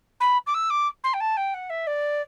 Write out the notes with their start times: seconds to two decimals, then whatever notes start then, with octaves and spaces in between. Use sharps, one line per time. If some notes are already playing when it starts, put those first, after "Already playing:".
0.20 B5
0.46 D6
0.54 E6
0.70 D6
1.03 C6
1.13 G5
1.20 A5
1.37 G5
1.54 F#5
1.69 E5
1.87 D5